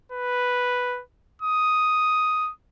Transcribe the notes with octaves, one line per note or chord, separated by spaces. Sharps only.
B4
D#6